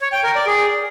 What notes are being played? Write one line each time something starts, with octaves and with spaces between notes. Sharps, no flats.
C#5
G5
A#4
D5
G#4